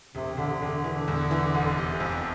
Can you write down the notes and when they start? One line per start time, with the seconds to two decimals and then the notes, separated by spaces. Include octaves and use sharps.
0.14 E1 C3
0.37 E1 D3
0.50 C3
0.61 E1 D3
0.84 D3 E3
1.08 E2
1.31 E3
1.54 F1
1.77 C3
2.00 F2